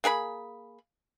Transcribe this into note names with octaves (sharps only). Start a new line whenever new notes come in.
A#3 G#4 F5 B5